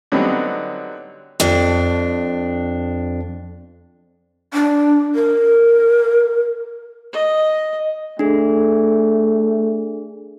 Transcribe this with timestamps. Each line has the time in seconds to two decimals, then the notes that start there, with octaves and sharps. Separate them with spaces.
0.12 D3 F#3 G3 B3 C4 D#4
1.40 F2 D4
4.54 D4
5.15 A#4
7.13 D#5
8.19 A3 D4 G#4